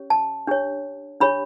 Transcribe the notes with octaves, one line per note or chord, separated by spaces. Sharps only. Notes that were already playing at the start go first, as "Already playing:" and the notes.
Already playing: C#4 G4 C#5
A5
D4 G4 C#5
D4 G4 C#5 B5